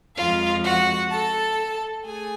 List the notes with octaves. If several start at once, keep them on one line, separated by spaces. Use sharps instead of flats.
F2 F3 G#3 F4 F5
F#4 F#5
A4 A5
A3 G#4 G#5